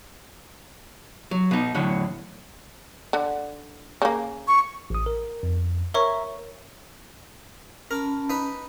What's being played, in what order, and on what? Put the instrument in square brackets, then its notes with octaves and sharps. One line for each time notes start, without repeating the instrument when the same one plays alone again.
[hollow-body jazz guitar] F#3
B2 D#4
E2 A2 D3 F#3
[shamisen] D3
C#3 A#3
[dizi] C#6
[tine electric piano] A1 D#6
A#4
F2
[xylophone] A#4 C#5 C#6 [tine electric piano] E5 A#5
[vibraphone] C#4 A5 B5 [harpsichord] A#4
[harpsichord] D#4 B4